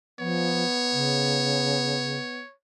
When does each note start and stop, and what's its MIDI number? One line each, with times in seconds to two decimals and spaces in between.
0.19 0.64 53
0.19 2.42 59
0.19 2.54 73
0.92 2.18 49